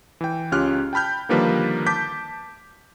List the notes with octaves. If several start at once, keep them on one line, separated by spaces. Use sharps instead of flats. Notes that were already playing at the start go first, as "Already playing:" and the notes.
E3 G5
C#2 C#4 F4 G4 F6 F#6
G5 A5 B5 F6 G6
D3 D#3 F3 G3 A#3 B4
A5 D6 G6 B6